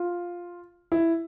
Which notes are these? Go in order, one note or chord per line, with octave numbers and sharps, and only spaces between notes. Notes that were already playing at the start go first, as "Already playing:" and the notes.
Already playing: F4
E4